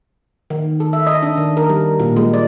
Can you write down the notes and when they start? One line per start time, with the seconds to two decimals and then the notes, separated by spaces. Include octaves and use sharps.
0.50 D#3
0.80 A4
0.93 E5
1.07 D#5
1.23 D4
1.38 D#3
1.57 A#4
1.70 G3
2.00 A#2
2.17 G#3
2.34 D5